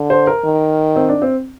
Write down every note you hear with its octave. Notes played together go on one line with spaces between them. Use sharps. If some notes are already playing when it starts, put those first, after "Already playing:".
Already playing: D3
C5
A#4
D#3
C4
D4
C4